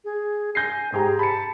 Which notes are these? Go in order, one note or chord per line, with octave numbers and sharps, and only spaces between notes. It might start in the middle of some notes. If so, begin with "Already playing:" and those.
G#4
G#5 G6 A#6 C7
G#2 G4 G#4 A#5
A5 B5 C#7